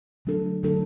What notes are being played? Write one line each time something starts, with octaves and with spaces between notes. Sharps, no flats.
D3 F#3 A3 D4 A4
D3 F#3 A3 D4 A4